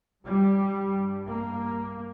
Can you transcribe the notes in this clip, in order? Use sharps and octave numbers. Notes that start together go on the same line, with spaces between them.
G2 G3
A#3